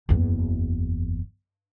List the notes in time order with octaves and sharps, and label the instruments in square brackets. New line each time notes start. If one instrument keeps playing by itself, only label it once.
[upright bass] F#1 E2